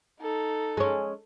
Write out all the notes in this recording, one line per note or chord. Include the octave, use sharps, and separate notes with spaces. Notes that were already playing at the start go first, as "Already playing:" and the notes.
D#4 A4
G#3 C#4